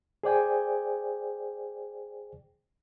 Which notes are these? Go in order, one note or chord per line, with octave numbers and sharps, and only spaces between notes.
G#4 C5 D5 G5 G#5